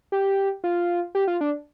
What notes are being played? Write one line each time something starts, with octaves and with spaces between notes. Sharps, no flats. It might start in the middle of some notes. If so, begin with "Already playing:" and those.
G4
F4
G4
F4
D4